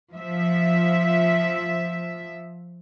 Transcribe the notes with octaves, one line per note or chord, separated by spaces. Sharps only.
F3 E5